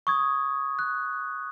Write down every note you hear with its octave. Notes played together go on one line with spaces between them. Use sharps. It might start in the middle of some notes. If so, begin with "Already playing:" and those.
C#6 D#6 G#6
F#6